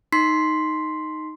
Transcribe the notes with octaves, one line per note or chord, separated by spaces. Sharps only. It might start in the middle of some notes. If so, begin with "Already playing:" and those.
D#4 C6 B6 C7